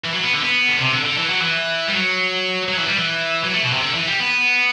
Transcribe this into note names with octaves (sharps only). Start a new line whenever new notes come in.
E3
F#3
B3
D3
B3
D3
C3
D3
D3
E3
F#3
E3
G3
F#3
F#3
E3
G3
E3
F#3
A3
B2
C3
D3
E3
G3
B3